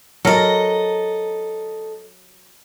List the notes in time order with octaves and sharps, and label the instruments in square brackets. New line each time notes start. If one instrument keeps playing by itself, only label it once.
[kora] F#3 A#4 [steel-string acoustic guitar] A4 D#5